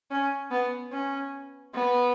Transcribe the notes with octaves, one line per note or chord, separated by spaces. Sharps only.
C#4
B3
C#4
B3